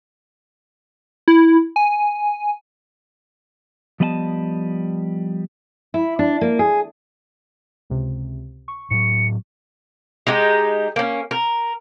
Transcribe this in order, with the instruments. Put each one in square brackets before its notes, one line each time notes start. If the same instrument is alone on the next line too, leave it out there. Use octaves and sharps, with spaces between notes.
[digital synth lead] E4
G#5
[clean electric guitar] F3 G3 B3 D#5 F#5 A5
[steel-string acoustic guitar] E4
D4
A#3
G#4
[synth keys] C#2 C3
C#6
[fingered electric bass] A2 F#3 [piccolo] C#7
[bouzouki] G#3 D#4 G4
A#3 C#4
A#4